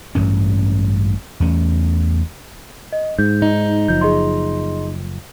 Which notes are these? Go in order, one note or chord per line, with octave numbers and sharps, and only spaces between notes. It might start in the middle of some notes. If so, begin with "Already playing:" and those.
A1 G2 C#4
E2 A3 C#4
D#5
G#2 G6
D#4
F#1 F3 G6
G#4 D#5 C6